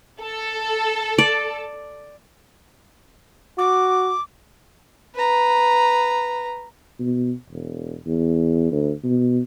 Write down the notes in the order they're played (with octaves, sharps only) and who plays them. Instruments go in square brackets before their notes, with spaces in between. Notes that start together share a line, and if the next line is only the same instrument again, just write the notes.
[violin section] A4
[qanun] D5
[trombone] F#4 [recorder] D6
[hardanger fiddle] B4 A#5
[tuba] B2
E1
E2
D2
B2